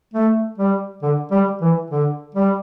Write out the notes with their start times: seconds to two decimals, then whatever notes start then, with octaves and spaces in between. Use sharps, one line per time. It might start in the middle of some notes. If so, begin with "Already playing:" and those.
0.13 A3
0.58 G3
1.02 D3
1.31 G3
1.61 E3
1.90 D3
2.35 G3